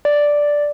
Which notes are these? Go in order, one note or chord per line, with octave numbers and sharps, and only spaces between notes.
D5